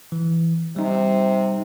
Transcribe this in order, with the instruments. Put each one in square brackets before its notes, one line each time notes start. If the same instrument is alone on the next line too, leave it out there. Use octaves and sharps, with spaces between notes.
[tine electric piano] E3
[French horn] C3 [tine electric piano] G3 D#4